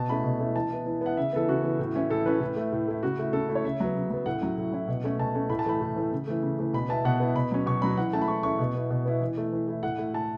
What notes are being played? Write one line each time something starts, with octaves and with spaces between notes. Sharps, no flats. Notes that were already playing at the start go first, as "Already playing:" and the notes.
Already playing: B2 A5
A3 C#4 E4 B5
B2
A3 C#4 E4
E3 A5
B3 E4
E3
B3 E4 F#5
C#3 E5
E3 B3 A4
C#3 F#4
E3 B3
A2
E3 C#4 E4
A2 A4
E3 C#4 E4 B4
A2
A3 E4
A2
A3 E4
C#3 F#4
A3 E4
C#3 A4
A3 E4
C#5
C#3 E5
F#3 B3
C#3
F#3 B3
A2 F#5
F#3 C#4 E4
A2
F#3 C#4 E4
B2
A3 C#4
B2 A5
A3 C#4
A2 B5
A5
E3 A3 B5
A2
E3 A3
C#3
E3 A3
C#3
E3 A3
B2 B5
B3 E4 A5
B2 F#5
B3 E4
B2 B5
F#3 C#4
B2 C#6
F#3 C#4 B5
E3 F#5
A3 C#4 E4 A5
B5
E3 C#6
A3 C#4 E4 C#6
B2
B3 E4
B2
B3 E4
E3
A3 E4
E3
A3 E4
A2 F#5
A3 E4
A2 A5